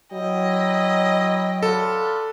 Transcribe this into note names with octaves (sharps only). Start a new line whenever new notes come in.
F#3 E4 D#5 G5
D4 F4 A4 B4